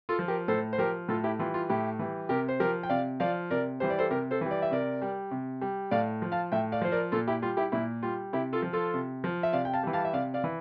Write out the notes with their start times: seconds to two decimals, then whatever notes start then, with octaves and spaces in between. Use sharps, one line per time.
0.09 F4 A4
0.19 F3
0.28 G4 A#4
0.48 A2 A4 C5
0.73 C5
0.78 F3 G4 A#4
1.08 A2 F4 A4
1.24 E4 G4
1.39 E3 G3 F4
1.54 F4
1.69 A2 E4 G4
1.99 E3 G3
2.29 C3 G4 A#4
2.49 C5
2.60 F3 G4 A#4
2.83 G5
2.89 C3 D5 F5
3.20 F3 D5 F5
3.51 C3 A#4 D5
3.80 E3 G3 C5
3.90 D5
3.99 A4 C5
4.11 C3 G4 A#4
4.31 A4 C5
4.41 E3 G3
4.51 D5
4.62 E5
4.71 C3 A#4 D5
5.02 G3
5.31 C3
5.61 G3
5.91 A2 D5 F5
6.22 F3
6.32 F5 A5
6.52 A2 E5 G5
6.72 D5 F5
6.81 F3 C5
6.92 A#4 D5
7.12 A#2 F4 A4
7.28 E4 G4
7.42 G3 F4
7.57 E4 G4
7.72 A#2 E4
8.03 G3 F4
8.33 C3 E4 G4
8.53 F4 A4
8.62 F3
8.73 F4 A4
8.94 C3
9.24 F3
9.43 E5
9.53 C3 D5 F5
9.65 G5
9.73 F5 A5
9.83 E3 G3
9.93 F5 A5
10.05 E5
10.13 C3 D5 F5
10.34 D5 F5
10.44 E3